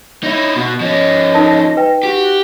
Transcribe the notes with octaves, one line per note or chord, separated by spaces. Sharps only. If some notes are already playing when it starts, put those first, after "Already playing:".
D#4 E4 C#5
B2 F#4
F3 C#4 D#5
D#4 A#4 A5
B4 G5
F#4 G4